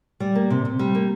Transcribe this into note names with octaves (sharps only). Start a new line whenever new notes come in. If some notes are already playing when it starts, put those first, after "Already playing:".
G3
A#3
C3
C3
G3
A#3